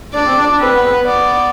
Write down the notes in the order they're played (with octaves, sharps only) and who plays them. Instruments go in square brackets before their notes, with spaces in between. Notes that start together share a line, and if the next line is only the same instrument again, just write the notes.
[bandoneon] D4 [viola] D5
[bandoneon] C4
D4
D4
[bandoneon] C4 [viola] B4
[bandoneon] B3
C4
B3
[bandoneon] B3 [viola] D5